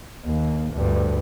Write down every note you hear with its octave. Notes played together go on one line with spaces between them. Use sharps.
D#2 A#3
D2 G2